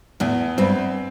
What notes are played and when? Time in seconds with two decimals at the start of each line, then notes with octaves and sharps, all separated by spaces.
0.20 E2 A2 A3
0.58 G2 G3 C4